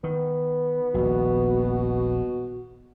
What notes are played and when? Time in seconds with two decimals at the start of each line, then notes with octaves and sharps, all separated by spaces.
0.04 D#3 B3
0.94 D#1 A#1 B2 F#4